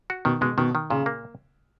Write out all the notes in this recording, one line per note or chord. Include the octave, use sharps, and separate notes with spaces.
F#4
B2 D#3
B2 G#3
B2 D#3
D#3
A#2 C#3
A#3